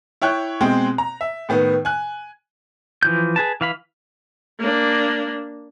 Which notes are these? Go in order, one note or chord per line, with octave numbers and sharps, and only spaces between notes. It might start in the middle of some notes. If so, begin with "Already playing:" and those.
E4 C#5 G5 F#6
B2 G#3 C4 G5
A#5
E5
A2 D#3 B3
G#5 F#6
E3 F3 G6
G#4 B4 A5
E3 F5 B5
A#3 D4